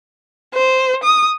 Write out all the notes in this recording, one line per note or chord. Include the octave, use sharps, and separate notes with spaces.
C5
D#6